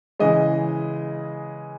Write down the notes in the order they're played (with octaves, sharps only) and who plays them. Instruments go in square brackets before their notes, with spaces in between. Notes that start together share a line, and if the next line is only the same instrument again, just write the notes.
[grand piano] C#3 E3 G#3 D#5